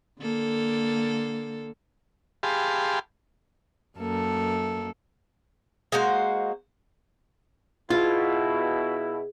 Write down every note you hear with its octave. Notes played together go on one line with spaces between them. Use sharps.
D3 A#3 A4
G4 G#4 F5 A5 B5 C6
F#2 A#3 A4
G#3 A#3 F#4 C5
B2 E4 F4 G#4